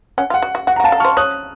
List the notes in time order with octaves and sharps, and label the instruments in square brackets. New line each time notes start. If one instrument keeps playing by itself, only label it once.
[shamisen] C#4 [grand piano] F#5
[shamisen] F4
[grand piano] F#5
[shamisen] F#4
F#4
[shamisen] F#4 [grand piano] F#5
[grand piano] A#5
[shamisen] F#4
[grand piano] F5 A5
[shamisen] A4
[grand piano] C#6 F6
[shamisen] C5
[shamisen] C#5 [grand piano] D#6 F#6